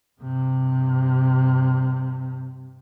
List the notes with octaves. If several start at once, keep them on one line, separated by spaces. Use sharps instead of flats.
G2 C3